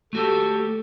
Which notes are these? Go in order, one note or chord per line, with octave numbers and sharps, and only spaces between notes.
A3 F#4 G4 A4